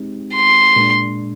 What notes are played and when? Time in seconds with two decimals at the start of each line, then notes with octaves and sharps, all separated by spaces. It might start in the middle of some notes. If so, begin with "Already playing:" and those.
Already playing: G#3 C4 D#4 G4
0.34 C6
0.76 A#2 G#3 D4